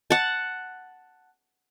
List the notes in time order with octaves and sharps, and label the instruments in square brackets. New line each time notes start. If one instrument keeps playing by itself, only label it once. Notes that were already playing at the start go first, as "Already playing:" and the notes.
[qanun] F#5 A5